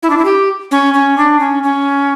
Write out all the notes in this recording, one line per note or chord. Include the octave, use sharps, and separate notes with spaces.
E4
D4
E4
G4
C#4
C#4
D4
C#4
C#4